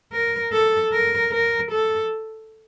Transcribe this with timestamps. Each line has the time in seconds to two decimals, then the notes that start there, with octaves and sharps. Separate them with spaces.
0.13 A#4
0.53 A4
0.92 A#4
1.32 A#4
1.72 A4